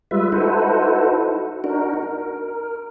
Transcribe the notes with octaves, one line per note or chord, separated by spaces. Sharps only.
G3 G#3 F4 B4 E5
D#4 E4 F#4 A4 B4 C5
D4 D#4 F#4 A#4
A#4